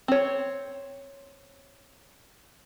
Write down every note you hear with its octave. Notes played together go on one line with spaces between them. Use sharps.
C4 C#5